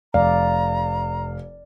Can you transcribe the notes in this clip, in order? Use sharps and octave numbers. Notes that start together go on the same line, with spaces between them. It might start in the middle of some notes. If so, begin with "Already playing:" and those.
F1 D5 F5 A#5